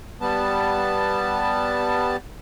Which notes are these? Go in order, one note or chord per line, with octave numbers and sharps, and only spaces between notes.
G3 B3 A5